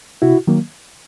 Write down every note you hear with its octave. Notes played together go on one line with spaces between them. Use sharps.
C3 E4 F#4
D#3 F#3 A#3